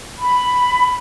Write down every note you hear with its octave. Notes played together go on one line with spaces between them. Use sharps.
B5